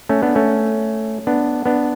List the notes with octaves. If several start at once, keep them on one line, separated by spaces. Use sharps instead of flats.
A3 C#4
B3 D4
A3 C#4
B3 D4
B3 D4